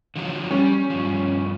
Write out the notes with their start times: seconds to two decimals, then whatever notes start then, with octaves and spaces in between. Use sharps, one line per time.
0.16 D3 F3 F#3
0.51 G3 C#4
0.90 G2 F3